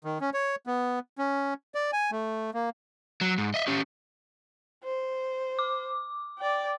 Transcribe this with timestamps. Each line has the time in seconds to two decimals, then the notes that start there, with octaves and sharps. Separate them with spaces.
0.04 D#3
0.21 C#4
0.34 C#5
0.67 B3
1.18 C#4
1.75 D5
1.93 G#5
2.12 A3
2.54 A#3
3.21 F#3
3.38 G#2
3.54 D#5 E5
3.68 C#4 G4
4.84 C5
5.59 D6
6.39 D5 G5